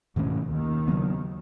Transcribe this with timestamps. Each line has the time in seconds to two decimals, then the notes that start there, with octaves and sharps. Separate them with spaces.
0.16 B1 G#2 B2 D#3 A3 C#4
0.52 D#2 D#3
0.88 C#3 F#3 B3